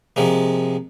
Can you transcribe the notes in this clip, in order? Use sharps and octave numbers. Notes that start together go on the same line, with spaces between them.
C3 F3 G#3 A#3